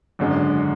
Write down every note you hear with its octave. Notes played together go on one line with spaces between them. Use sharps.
G#1 F#2 D3 G#3